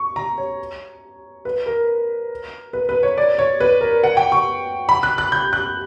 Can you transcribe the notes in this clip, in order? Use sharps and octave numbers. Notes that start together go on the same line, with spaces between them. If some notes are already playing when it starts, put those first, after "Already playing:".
Already playing: C#6
A#5
C#5
B4
A#4
B4
B4
C#5
D5
C#5
B4
A#4
F#5
G5
C#6
B5
F#6
F#6
G6
F#6